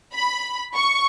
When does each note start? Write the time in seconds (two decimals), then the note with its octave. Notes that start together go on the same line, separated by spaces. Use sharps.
0.14 B5
0.76 C#6